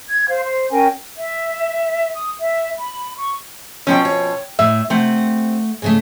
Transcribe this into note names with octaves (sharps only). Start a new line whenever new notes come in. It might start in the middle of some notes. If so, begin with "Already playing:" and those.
G#6
C5 F5
C5
C#4 A#4 G5 G#5
E5
D#6
E5
B5
C#6
B2 F3 F#3 B3 C#4 G5
C#5
A2 E5
C3 A3 C4 F#5
G#2 C#3 A3